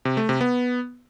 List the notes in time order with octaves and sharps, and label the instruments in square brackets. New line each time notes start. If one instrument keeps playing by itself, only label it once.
[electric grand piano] C3
A3
C3
B3